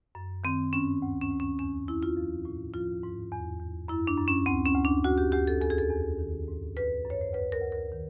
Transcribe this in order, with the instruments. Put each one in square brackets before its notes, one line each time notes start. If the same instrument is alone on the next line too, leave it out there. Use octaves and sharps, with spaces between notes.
[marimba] F#2
D#3 C4
G2 C#4
D2
C#4
D2
C#4
E2 C#4
E2 E4
F4
F3
A2
F3 F4
G#2
E2
E2
F#2 E4
D4
F#2
C#4
D2 C4
C#4
D2
D4
D2 F#4
G4
D2 G4
A4
E2 A4
G#4
A4
E2
D#3
G#2
F#2 B4
F#2
C#5
C5
D2 B4
A#4
D2
A#4
D#3